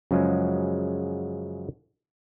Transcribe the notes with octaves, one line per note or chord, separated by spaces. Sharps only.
F#2 C#3 F3 F#3 G#3